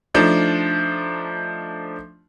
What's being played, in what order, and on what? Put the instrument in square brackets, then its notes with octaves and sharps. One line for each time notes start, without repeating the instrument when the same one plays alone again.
[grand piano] F3 A3 D4 D#4